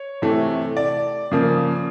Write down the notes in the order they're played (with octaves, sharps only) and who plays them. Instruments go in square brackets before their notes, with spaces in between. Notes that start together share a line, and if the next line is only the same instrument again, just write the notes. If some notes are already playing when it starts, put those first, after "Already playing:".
Already playing: [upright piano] C#5
C3 E3 A3
D5
C#3 F3 A#3